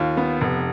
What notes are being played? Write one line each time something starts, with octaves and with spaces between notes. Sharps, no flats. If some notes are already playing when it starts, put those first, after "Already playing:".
Already playing: D#2 F4
B3
F1